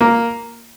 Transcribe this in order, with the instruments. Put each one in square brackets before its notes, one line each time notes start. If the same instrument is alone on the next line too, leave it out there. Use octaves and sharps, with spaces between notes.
[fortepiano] A#3